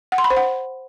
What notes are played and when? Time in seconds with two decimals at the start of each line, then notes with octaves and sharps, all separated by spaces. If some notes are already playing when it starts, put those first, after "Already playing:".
0.12 F#5
0.18 C6
0.24 B5
0.30 C5
0.37 F#5